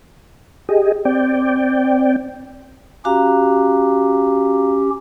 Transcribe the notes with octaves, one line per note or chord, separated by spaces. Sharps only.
G4 G#4 D#5
C4 D5 G5
C#4 F#4 G4 F5 A#5